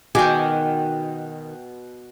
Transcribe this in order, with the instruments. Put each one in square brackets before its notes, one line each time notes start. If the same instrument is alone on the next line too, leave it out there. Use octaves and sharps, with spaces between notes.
[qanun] B2 [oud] D#3 [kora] F#4 G#4 [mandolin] G5 D6